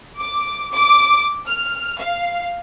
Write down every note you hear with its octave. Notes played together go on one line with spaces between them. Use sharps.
D6
D6
F6
F5